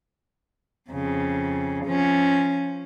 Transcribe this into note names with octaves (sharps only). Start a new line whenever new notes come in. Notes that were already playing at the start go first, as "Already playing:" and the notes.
F2 C#3
F3 C#4